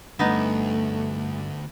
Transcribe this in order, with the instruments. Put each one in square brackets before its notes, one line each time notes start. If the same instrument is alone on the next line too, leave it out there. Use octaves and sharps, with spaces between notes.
[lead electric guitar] D2 [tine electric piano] G2 [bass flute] A3 [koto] B3 D#4